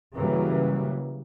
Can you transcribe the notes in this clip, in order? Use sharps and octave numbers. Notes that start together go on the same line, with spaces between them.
C#3 E3 F#3 G3 A#3